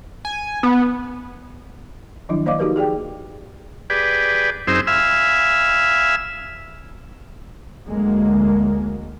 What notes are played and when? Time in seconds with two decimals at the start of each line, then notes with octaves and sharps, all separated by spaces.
0.25 G#5
0.63 B3
2.29 D#3 F3 F#3 D4 E4
2.46 A#3 C5 D5 D#5 F5 D6
2.59 D#4 F#4 G4 A#4 B4
2.76 G4 G#4 D5 G5
3.90 G4 G#4 B4 D5
4.67 F#2 C4 D#4 G#4 C5 E6
4.87 E5 F5 G#5 B5 E6
7.87 D2 F#3 G#3 A#3